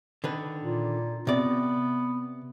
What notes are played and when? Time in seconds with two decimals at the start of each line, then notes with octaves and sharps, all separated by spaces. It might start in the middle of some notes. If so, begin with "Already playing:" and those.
0.24 D3 D#3 B4
0.62 A#2
1.27 C3 B3 D5